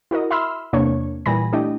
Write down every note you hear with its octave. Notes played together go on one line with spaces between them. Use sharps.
E4 F#4 A#4 D#5
E5 B5 C6 E6 F6
E2 C3 A#3 D4 C#5 C#6
A#2 E3 G3 G#5 B5 A#6
A3 D4 E4 G4 D#5